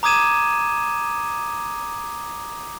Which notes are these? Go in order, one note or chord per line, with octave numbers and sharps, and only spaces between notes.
A#5 D6 D#6 G#6 D#7 E7